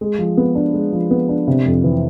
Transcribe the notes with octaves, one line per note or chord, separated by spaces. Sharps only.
G#3
F3
B3
D4
G#3
F3
B3
D4
C3
F2
E3